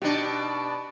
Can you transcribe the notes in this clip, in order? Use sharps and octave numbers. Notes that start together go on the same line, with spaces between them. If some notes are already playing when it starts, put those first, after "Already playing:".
B2 D4 D#4 G4